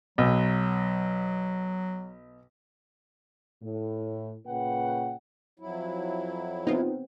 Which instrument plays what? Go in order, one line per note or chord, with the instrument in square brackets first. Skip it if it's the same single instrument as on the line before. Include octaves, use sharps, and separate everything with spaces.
[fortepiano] B1 [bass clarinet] F#3
[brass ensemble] A2
A#2 C#3 B4 F#5 G5
[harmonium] F2 F#3 E4
[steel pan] B3 C4 [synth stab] D#4 F4